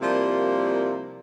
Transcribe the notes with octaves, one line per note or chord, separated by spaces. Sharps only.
C3 F3 G3 A#3 E4 A#4